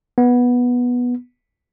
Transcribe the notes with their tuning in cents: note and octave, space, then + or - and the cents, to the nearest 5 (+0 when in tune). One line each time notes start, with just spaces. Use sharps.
B3 -10